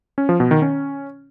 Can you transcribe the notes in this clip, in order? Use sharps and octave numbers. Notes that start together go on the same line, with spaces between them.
C#4
F3
B2
D#3
C#4